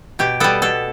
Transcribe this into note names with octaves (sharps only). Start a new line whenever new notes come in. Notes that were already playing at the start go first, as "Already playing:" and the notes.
B2 G4
G3 B3 A4
B2 A4